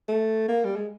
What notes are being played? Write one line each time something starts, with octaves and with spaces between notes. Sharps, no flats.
A3
A#3
G3
G#3